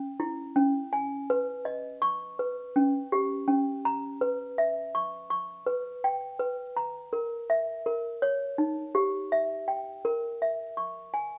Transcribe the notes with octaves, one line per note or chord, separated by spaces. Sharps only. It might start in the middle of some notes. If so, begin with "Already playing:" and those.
Already playing: C#4
E4
C#4
G#5
B4
D#5
C#6
B4
C#4
G4
C#4
A#5
B4
E5
C#6
C#6
B4
G5
B4
A#5
A#4
E5
A#4
C#5
D#4
G4
E5
G5
A#4
E5
C#6
G#5